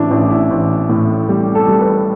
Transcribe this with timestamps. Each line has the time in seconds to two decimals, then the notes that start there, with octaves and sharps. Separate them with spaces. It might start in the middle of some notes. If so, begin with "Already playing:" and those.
Already playing: A1 D4 E4
0.11 A1 E4
0.31 E4
0.50 A1
0.89 A2
1.29 G3 G4
1.55 A4
1.68 G3
1.81 B4